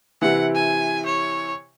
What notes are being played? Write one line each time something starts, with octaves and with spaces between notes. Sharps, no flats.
C3 E3 F#5
G#5
C#5